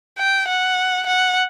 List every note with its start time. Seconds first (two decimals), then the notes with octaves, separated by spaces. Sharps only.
0.19 G5
0.48 F#5
1.06 F#5